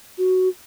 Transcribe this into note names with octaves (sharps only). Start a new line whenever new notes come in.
F#4